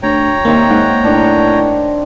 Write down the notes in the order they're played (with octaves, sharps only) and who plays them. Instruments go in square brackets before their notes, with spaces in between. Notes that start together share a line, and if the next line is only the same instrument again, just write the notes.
[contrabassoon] D2 [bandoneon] C#5 G5 A#5
[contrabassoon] D#2 [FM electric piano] A#3 [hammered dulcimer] C4 D#4 E5
[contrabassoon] G#2 [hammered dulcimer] F#5
[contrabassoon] A2 [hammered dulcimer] D#3 D4